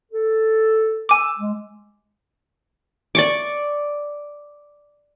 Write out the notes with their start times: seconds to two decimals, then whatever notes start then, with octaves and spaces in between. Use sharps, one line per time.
0.12 A4
1.09 G#5 D6 E6
1.39 G#3
3.15 D5 C#6 D6